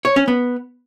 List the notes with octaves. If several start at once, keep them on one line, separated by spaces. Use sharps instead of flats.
C#5
C#4
B3